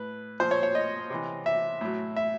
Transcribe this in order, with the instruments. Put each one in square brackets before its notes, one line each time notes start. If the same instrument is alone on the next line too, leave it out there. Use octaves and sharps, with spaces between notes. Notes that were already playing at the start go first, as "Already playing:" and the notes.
Already playing: [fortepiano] A2 B4
A#2 F3 C5
C#5
C#5
D#5
C3 E3
E5
A2 F#3
E5